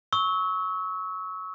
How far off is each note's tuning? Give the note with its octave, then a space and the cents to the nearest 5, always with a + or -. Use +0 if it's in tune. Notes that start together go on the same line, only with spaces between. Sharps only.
C#6 +0 E6 -30